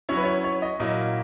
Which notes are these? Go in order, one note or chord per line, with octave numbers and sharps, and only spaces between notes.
F#3 C#4 E4 C#5
B4
C#5
C#5
D#5
A#2 F#3 A#3 E4 D#5